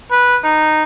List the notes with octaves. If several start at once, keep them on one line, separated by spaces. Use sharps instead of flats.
B4
D#4